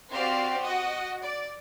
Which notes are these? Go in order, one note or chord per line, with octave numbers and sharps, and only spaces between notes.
C4 F#4 G4 C5 D5 F5
F#4 D#5 F#5
D5